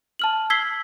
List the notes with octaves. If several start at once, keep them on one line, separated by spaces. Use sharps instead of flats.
A5 F6 F#7
E6 G#6 B6 C7 G7